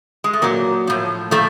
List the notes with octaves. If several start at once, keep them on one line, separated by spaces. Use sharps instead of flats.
G#3
A3
A#2 F#3 A#3
A2 F3
A#2 F3 A3